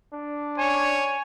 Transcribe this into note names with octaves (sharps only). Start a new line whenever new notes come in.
D4
C#5 G#5